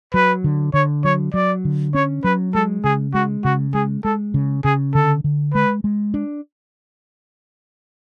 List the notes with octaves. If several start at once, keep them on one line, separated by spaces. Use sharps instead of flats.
F#3 B4
D3
D3 C#5
F#3 C#5
F#3 D5
D3
C#4 C#5
F#3 B4
G#3 A4
C#3 G#4
G#3 F#4
C#3 F#4
G#3 G#4
G#3 A4
C#3
C#3 G#4
D3 A4
D3
G#3 B4
G#3
D4